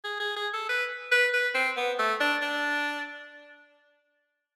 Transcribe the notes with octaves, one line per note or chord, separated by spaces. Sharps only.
G#4
G#4
G#4
A4
B4
B4
B4
C4
B3
A3
D4
D4